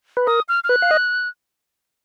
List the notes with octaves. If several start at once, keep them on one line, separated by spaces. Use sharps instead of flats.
B4
A#4 D#6
F6
F6
B4 F#6
F5
D#5